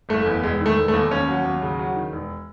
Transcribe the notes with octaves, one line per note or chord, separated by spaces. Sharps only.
F#1 A3
E2
E1 G#3
D#3
A3
E1
A3
D#2
D#2 C#4
F#3
D#2
C#3
F#3
D#3
E1